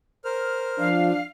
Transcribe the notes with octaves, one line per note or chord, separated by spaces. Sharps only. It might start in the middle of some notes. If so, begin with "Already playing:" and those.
A#4 C5 F6
F3 D4 F5